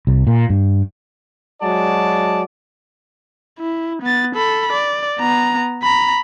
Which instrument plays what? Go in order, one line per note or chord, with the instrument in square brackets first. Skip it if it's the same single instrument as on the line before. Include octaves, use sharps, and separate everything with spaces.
[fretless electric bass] C2
A#2
G2
[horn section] F#3 G#3 F#4 D5 A5
[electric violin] E4
B3 A6
A4 B5
D5
B3 A#5
A#5 B5